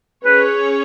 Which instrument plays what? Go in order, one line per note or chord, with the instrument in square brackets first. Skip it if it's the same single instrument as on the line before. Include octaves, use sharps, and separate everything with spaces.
[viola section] C#4 G#4 C#5 [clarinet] B4